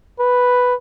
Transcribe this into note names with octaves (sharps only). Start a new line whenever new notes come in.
B4